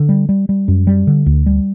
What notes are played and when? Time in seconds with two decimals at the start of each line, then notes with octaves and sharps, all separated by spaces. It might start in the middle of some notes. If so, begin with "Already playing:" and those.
Already playing: D3
0.09 G3
0.29 G3
0.49 G3
0.68 F#2
0.87 G3
1.07 D3
1.26 D2
1.46 G3